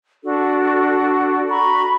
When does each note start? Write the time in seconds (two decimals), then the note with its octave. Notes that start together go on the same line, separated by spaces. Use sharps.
0.24 D4 F#4 A4
1.50 F#4 A#5 B5 C#6